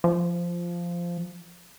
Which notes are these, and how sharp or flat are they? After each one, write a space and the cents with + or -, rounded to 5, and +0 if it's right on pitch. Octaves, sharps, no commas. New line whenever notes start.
F3 -10